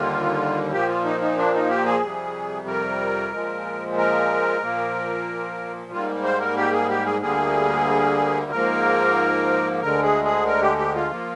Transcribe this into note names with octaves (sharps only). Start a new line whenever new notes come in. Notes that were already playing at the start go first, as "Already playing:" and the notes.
Already playing: D#2 D3 G3 A#3 F4
A#2 F3 A#3 G4
F4
D#4
D#4
D4
D#4
G4
G#4
F2 C3 G3
A#4
A#2 F3 G#3
A#4
A#2 F3 A#3
G#2 G3 A#3 F4
C5
A#4
G4
G#4
G4
G#4
D2 D3 G3 A#3 G#4
G#2 F3 A#3 A#4
D2 D3 G#3 A#4
G#4
G#4
A#4
G4
G4
F4
F3 A#3